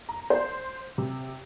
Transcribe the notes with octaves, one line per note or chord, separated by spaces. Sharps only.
A#5
C5
C3